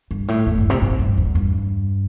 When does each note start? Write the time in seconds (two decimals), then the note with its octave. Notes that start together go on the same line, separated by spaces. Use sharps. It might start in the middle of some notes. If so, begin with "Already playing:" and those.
0.11 G2
0.28 A2
0.46 E2
0.58 G2
0.70 C3
0.82 A2
0.99 G2
1.18 E2
1.35 G2